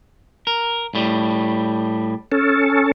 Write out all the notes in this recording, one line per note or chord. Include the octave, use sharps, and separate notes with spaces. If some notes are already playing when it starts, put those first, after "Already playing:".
A#4
A2 G3
C#4 A4